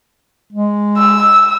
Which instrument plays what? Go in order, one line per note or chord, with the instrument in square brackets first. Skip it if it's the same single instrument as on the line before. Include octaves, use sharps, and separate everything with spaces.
[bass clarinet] G#3
[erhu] E6